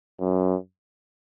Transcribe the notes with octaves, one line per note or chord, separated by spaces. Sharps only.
F#2